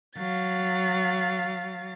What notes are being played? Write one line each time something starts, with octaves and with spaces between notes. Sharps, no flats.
F#3 F5 A6